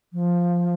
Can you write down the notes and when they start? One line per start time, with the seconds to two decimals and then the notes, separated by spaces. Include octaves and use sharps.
0.13 F3